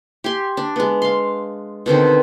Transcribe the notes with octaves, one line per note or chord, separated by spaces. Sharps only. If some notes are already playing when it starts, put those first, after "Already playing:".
G4 G#5 C6
D4
G#3 B3
F5 C6
B2 D3 D#3 C4